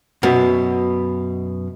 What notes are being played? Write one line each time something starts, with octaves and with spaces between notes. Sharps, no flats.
F#2 B2